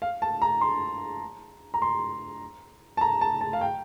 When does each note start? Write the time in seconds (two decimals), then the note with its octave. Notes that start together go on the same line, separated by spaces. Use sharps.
0.02 F5
0.22 A5
0.42 A#5
0.61 C6
1.74 A#5
1.82 C6
2.97 A5
3.01 A#5
3.21 A5
3.41 A5
3.53 F5
3.61 G5